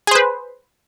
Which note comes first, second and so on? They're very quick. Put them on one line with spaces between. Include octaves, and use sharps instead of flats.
G#4 C5 B4